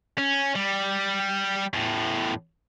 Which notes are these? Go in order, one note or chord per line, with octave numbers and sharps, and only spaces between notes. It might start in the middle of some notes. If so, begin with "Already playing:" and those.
C#4
G3
E2 A2